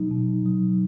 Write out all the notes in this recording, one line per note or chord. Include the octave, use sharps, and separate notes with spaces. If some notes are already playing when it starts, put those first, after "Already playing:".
Already playing: B2 F#3 D#4
B2
F#3